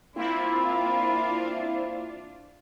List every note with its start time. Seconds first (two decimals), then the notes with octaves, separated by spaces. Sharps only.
0.16 A#3 C4 D4 E4 F4 B5